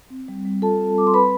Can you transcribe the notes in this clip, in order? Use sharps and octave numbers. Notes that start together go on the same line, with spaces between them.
C4
G3
G3
F4 A4 A5
C4
G3 D6
C6
C4 B4 B5